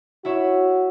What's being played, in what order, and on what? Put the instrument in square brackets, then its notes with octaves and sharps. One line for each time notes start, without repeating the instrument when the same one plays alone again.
[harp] E4 C#5 E5 [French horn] F#4